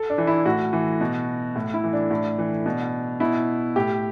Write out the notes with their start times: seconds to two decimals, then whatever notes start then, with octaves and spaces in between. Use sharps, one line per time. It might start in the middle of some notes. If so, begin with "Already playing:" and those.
Already playing: A4
0.10 D4
0.18 E3
0.27 E4
0.46 A2 F#4
0.73 E3
1.01 B2
1.56 A2
1.74 E4
1.84 E3
1.93 D4
2.11 A2
2.38 E3
2.66 B2
3.20 B2 E4
3.76 A2 G4